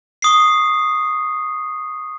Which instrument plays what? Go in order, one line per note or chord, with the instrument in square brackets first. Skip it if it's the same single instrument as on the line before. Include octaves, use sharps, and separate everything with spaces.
[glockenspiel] C#6 D#6 C7